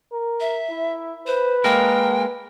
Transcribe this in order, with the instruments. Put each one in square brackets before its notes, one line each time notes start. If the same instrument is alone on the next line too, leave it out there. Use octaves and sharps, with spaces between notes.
[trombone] A#4
[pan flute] E5
[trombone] E4
[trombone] B4 [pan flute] C5
[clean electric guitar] G#3 A#3 A#4 [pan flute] G5